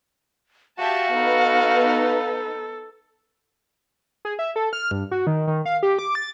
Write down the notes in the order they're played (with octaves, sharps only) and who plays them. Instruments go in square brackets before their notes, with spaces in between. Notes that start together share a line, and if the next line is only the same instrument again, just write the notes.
[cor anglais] F#4 [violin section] G4 E5 A5 [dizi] F5
[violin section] B3 D#4 B4 [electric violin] A4
[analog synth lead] G#4
E5
A4
F6
G2
F#4
D#3
D#3
F5
G4
D6
A6